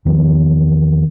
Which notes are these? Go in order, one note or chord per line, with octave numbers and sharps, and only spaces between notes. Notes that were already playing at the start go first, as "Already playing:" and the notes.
E2 D#3 F3 B3